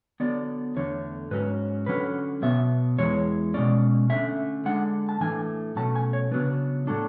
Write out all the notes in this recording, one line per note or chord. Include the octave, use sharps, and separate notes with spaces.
D3 F#3 B3 D5
E2 D3 A3 C#5
G#2 F#3 C#4 B4
D3 F#3 C#4 B4
B2 F#3 B3 E5
E2 C#3 E3 G#3 C#5
B2 G#3 C#4 D5
D3 A3 C#4 E5
D3 G#3 D4 F#5
A5
A2 E3 A3 D4 G#5
B2 F#3 A3 C#4 A5
G#5
C#5
C#3 F#3 B3 D4 B4
A2 F#3 A3 D4 A4